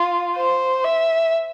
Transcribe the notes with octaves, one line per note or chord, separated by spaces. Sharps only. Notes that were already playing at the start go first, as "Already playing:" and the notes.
Already playing: F4
C5
E5